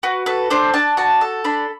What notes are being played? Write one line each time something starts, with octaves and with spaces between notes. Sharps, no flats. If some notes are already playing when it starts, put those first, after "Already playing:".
F#4 B4
A4 B4
D4 C5
D4 A5
F#4 A5
A4
D4 B5